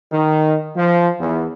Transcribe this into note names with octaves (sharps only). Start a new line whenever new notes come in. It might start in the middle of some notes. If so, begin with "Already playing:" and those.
D#3
F3
E2